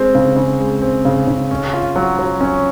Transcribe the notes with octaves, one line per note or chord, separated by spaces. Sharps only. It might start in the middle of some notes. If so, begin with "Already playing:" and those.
Already playing: G#3 C4
C#3
C#3
G#3
C4
C#3
C#3
C#4
F4
F#3
F#3
C#4